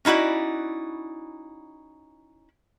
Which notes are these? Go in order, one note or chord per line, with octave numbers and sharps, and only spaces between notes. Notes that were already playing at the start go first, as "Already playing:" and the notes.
C#4 D#4 E4 F#4 D5